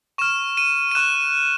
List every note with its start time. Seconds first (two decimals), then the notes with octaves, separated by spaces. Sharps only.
0.18 C#6 F6 E7
0.57 D#7
0.91 D#7
0.95 C#6 F#6 E7